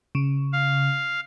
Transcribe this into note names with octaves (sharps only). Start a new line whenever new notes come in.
C#3
F5